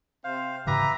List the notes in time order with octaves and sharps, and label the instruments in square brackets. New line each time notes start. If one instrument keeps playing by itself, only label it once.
[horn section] C3 C4 F5 [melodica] C5
[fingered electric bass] G#2 C#3 E3 [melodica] G4 B4 E5 [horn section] A#5